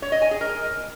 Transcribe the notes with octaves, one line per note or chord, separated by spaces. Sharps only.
C#5
D#5
G#5
G#4
A#4